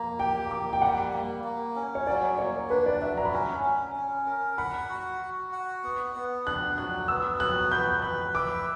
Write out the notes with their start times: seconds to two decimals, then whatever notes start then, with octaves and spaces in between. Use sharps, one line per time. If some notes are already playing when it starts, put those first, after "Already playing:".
Already playing: A#3 A#5
0.19 G4 G5
0.51 A#3 D6
0.73 G5
0.82 G3 F#5
1.13 A#3
1.44 A#3
1.76 C#4
1.95 C#5
2.07 F#3 D5
2.38 A#3 C#5
2.70 D4 B4
2.86 D5
3.01 F#3 E5
3.17 A#5
3.25 B5
3.33 C#4 A#5
3.64 C#4
3.96 C#4
4.26 A#4
4.58 F#5 B5
4.89 F#4
5.21 F#4
5.52 F#5
5.84 B3
6.15 B3
6.46 D4 F#6
6.78 F#3 F#6
7.08 B3 E6
7.40 F#3 F#6
7.71 B4 G6
8.02 B4 F#6
8.35 E5 D6